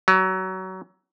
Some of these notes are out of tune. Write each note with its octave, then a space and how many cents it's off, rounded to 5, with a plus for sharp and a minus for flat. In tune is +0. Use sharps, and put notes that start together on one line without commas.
F#3 +25